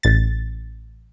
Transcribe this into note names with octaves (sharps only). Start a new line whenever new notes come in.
A1 A6